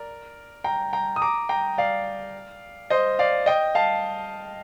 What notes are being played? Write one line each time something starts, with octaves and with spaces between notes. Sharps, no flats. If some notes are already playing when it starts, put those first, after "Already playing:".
Already playing: A#4 D5
G5 A#5
G5 A#5
D#6
A#5 D6
G5 A#5
D5 F5
C5 D#5
D5 F5
D#5 G5
F5 A5